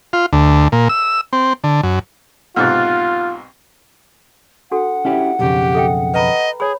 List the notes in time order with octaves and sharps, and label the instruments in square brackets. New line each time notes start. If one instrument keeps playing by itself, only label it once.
[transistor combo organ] F4
D2
A#2
E6
C4
D3
F#2
[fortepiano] B1 G#2 C3 [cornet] F4 [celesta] F6 F#6 A6
[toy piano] D4 F#4 A4 [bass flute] F#5
[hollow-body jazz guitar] C#4 E4 G4
[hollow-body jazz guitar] B1 F2 C#3 [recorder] G4
[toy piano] A4 E5 G5
[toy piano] B4 A#5 B5 [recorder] D#5
[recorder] G#4 [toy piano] C#5 B5